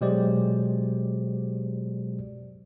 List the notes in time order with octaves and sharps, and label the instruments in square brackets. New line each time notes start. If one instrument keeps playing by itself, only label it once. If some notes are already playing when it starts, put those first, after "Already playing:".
[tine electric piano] B2 F#3 G#3 G4 C5 D5